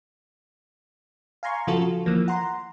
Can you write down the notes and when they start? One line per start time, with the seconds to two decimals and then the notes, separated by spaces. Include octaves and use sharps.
1.43 F5 G#5 A#5 C6 C#6
1.67 C#3 F3 F4 F#4 A4
2.06 E3 F3 A#3
2.28 F#5 A#5 C6